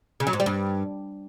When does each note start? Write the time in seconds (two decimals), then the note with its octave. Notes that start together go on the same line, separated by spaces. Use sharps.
0.20 C#3
0.27 F#3
0.33 G#2
0.40 G3
0.46 G2